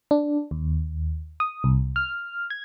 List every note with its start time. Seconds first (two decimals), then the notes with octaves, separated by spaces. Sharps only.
0.11 D4
0.51 D#2
1.40 D#6
1.64 C2
1.96 F6
2.50 G#6